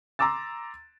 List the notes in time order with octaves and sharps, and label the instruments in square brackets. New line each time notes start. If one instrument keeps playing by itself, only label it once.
[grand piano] A#5 C6 D6 E6 A6